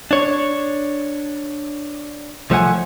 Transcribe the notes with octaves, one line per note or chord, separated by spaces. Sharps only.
D4 C#5
C2 F3 A3 B4 F#5 G#5